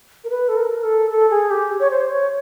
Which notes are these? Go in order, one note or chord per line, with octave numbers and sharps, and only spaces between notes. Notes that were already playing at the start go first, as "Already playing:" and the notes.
A#4
B4
A4
A#4
A4
A4
G#4
G4
C#5
C5
C#5